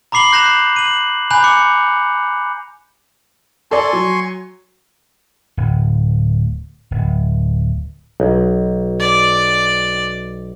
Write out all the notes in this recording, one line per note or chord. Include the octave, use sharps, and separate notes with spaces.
A#5 B5 D6 C7 F#7 G7
F#6 G6 A#6 C7 E7 F7
D#7 F#7
G#5 A#5 B5 F#6 G6 F7
D6 C#7
A4 D5 G#5 C6 C#6
F#3
D1
D1
B1
D5